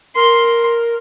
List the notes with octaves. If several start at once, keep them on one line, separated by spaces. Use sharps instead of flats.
A#4 C6